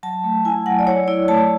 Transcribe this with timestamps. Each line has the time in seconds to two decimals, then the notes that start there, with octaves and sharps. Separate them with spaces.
0.03 F#3 A5
0.24 A3
0.45 E4 G#5
0.66 F#3 F#5
0.79 D5
0.87 E4 C#5
1.08 E4 D5
1.28 A3 A5